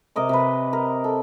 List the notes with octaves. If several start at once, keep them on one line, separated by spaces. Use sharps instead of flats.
C3 A#4 D#5 D6
C3 B4
A#4
A4